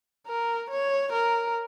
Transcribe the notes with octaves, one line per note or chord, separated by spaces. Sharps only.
A#4
C#5
A#4